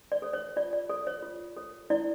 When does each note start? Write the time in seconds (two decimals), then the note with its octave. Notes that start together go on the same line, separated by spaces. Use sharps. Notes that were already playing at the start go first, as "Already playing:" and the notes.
0.12 D5
0.22 A4 C#5
0.33 C#5
0.56 F4 D5
0.73 D5
0.89 A4 C#5 D5
1.07 C#5
1.23 F4
1.57 A4 C#5
1.90 E4 D5